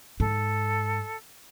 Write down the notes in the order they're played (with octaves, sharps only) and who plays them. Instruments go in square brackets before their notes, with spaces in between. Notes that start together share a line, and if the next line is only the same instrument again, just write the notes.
[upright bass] G#2 [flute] A4